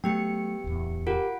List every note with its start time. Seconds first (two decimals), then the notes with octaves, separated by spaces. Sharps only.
0.04 F#3 A3 B3 G4 G5 C#7
0.64 D1 E2
1.07 F4 G4 A#4 F#5 D7